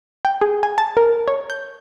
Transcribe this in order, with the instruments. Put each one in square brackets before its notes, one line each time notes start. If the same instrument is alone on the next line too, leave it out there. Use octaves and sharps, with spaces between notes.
[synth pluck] G5
G#4
G#5
A5
A#4
C#5
G6